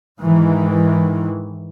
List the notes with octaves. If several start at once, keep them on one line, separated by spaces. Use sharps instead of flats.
G#2 D#3 E3